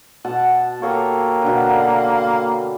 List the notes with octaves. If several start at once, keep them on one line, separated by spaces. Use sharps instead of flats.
B2 F#5 A5
A#3 G4 A4 C#5
B2 D3 B4